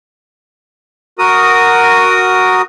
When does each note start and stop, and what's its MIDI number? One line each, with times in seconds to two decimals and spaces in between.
1.19 2.62 66
1.19 2.62 70
1.19 2.62 87